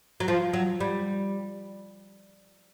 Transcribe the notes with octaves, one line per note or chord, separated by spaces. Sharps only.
F#3
F3
F#3
G3